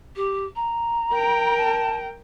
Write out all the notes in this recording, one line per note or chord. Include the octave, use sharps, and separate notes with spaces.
G4
A#5
A#4 G5
A5